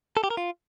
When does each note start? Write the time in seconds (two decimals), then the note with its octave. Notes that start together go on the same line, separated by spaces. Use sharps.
0.17 A4
0.24 G4
0.30 A#4
0.37 F4